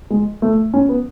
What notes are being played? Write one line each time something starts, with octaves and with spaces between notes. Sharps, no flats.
G#3
A3
C#4
B3